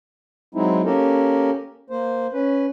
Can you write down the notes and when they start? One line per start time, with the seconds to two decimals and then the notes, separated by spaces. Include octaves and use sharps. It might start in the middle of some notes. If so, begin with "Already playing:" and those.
0.55 F#3 G#3 C4 D#4 E4
0.85 A#3 C#4 G4 A4 A#4
1.90 A#3 C5
2.33 C#4 B4